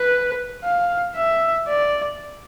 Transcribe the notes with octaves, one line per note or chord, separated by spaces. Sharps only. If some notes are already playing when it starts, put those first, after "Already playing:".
Already playing: B4
F5
E5
D5